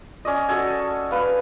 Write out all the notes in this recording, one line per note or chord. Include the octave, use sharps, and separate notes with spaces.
C#4 D5 D#5
F#4 A4 G#5
B4 F5